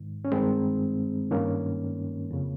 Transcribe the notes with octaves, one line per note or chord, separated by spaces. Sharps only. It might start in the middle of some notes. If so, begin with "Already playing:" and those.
Already playing: G#2 D#3
C#4
G2 D#3 G#3 C4
G2 D#3 A#3 C#4
F2 C#3